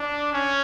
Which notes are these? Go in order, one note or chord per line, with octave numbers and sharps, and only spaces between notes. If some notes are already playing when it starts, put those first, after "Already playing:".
Already playing: D4
C#4